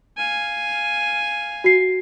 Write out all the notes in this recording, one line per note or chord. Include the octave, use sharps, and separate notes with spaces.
F5 G#5
F#4 C7